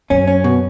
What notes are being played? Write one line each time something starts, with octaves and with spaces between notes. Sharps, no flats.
F#2 C#4
C#4
B2